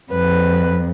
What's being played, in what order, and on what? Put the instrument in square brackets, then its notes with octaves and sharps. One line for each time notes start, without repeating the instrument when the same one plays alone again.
[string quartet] F2 [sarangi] B4